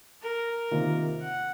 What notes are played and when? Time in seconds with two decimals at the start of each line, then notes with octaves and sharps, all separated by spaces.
0.22 A#4
0.71 C3 D#3 A#3 F4
1.21 F#5